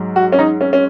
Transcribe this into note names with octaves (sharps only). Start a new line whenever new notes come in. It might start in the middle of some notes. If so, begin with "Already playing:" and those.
Already playing: G#2 F#3
F#4
C#4
D#4
C#4
C#4